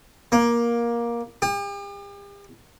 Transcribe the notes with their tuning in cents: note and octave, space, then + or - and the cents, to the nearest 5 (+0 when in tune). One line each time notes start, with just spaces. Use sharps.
A#3 +15
G4 +40